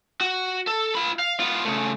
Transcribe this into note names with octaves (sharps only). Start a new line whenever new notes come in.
F#4
A4
F4 B5
F5
B3 F4
C#3 A3